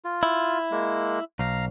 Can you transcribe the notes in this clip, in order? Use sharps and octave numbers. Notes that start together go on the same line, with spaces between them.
F4
E4
G#3 A#3
B1 F5 A#5